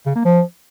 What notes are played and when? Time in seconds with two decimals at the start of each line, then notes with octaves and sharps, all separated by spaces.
0.06 C#3
0.15 A#3
0.25 F3